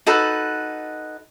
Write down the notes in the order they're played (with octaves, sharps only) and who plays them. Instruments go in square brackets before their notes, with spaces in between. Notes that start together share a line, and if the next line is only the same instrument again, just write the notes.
[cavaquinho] D#4 F#4 A4 B4